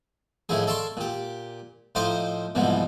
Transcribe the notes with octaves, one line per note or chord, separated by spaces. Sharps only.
A2 D#3 F3 E4 G#4
A4 D5 F5 A5 C6 C#6
A#2 G4
A2 F3 D#4 F4 C5 D6
C2 G#2 B2 E3 F3